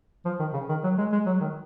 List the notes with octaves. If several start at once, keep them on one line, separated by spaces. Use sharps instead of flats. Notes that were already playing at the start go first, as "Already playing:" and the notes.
F3
D#3
C#3
D#3
F#3
G#3
G#3
F#3
D#3